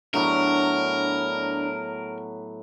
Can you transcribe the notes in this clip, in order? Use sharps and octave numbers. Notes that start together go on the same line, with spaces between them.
A2 F#3 B3 D4 A#4